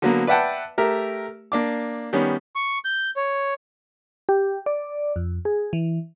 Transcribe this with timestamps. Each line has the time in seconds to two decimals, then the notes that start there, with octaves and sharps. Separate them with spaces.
0.02 D3 F#3 A#3 B3
0.27 B4 D5 E5 F#5 G5 A5
0.78 A3 G4 A#4 E5
1.52 A#3 D4 D6
2.13 D#3 G3 B3 C#4
2.56 C#6
2.85 G6
3.16 C#5
4.29 G4
4.66 D5
5.16 F2
5.45 G#4
5.73 E3